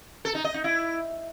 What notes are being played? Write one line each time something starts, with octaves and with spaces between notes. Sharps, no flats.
A4
D#4
D#5
D#4
E4